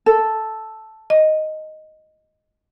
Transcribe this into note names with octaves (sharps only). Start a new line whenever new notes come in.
A4
D#5